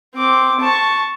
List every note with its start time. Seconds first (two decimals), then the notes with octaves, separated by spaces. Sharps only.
0.15 C4 D6
0.60 A5 C#6